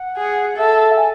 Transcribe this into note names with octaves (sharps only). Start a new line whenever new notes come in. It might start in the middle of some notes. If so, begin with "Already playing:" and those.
Already playing: F#5
G#4
A4 E5
F#5
G#5